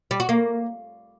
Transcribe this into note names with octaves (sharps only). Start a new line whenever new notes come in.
G3
F#4
A#3